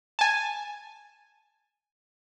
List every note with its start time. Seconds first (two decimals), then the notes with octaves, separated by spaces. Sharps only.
0.19 G#5 A5